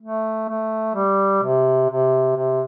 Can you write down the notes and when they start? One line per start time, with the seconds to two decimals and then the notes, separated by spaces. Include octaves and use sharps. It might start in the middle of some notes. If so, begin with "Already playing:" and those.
0.01 A3
0.49 A3
0.95 G3
1.43 C3
1.90 C3
2.36 C3